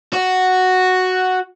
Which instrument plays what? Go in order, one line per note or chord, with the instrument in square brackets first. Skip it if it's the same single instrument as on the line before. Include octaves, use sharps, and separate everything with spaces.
[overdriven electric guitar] F#4